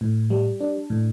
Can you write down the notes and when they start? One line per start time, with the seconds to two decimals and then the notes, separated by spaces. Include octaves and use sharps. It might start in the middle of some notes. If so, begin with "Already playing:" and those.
0.01 A2
0.30 G3
0.61 D4
0.90 A2